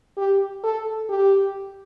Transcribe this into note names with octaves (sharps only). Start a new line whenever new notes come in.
G4
A4
G4